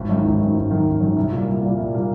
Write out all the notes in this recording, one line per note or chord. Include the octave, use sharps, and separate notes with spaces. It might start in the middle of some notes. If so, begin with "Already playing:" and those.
Already playing: G#1
F#2 D#3
G#1
F#2 D#3
G#1
F#2 D#3
G#1
F#2 D#3
C2
A#2 G3 A#3
C2
A#2 G3 A#3
C2
A#2 G3 A#3